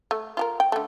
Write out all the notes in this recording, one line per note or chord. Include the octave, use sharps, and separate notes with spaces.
A3
F4 G4 A#4
G5
D3 A3